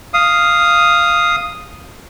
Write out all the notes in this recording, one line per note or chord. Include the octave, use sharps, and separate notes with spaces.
F5 D#6